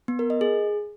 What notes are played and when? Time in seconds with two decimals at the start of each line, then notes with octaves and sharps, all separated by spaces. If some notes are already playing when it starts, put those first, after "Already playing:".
0.08 B3
0.19 A#4
0.30 D#5
0.41 G#4